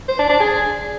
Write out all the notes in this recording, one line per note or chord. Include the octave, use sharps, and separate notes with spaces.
C5
D4
D4
G#4